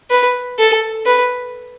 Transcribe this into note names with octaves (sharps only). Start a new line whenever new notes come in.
B4
A4
B4